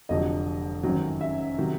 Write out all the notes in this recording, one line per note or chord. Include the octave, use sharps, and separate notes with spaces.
F1 F2 D3 F#3 D#5
G#1 F#2 D#3 F#3
E5
C3 D#3 F#3